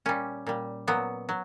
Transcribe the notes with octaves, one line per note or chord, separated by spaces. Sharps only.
A#2 G3 C#4
A#2 G3
A#2 F#3 B3
F#3